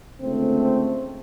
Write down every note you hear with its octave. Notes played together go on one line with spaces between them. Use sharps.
C#2 D3 A3 C4